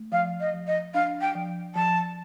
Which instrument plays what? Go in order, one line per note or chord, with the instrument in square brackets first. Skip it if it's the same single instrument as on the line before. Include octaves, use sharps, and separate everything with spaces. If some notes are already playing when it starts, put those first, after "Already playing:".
Already playing: [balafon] A3
[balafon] F3 [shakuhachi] F5
[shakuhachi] D#5
[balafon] F3
[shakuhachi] D#5
[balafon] D4 [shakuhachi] F5
[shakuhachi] G5
[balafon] F3
[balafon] F3 [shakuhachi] A5